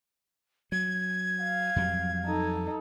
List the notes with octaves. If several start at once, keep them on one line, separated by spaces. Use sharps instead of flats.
F#3 G#6
F5
F2 F#3 G3
D#4 A4